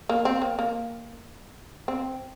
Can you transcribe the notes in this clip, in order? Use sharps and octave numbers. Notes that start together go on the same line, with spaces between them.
A#3
C4
A#3
A#3
C4